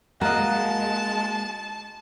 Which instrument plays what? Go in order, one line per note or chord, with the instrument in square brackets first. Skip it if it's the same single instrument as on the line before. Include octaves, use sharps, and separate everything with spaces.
[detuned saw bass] G#3 [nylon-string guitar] A#3 A#4 [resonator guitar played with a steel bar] F#4 D#5 [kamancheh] A5